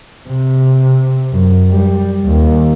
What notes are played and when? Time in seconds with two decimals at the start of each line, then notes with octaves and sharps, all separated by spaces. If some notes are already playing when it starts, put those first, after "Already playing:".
0.28 C3
1.33 F#2
1.69 G3
2.25 D#2